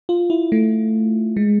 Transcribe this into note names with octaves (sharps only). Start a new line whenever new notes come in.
F4
E4
A3
G#3